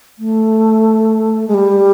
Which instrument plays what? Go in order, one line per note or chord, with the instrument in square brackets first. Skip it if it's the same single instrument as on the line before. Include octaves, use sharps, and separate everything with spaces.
[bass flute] A3
G#3
G3